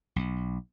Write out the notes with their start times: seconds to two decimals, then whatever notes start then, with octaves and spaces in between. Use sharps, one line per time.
0.16 B1